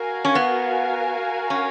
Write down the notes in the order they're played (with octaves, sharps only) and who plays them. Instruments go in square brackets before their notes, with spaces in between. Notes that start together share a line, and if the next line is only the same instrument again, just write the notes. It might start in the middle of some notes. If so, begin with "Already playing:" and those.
Already playing: [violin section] F#4 A#4 F5 G#5
[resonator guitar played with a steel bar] C#4
B3
C#4